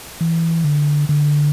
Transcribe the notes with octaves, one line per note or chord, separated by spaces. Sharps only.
E3
D3
D3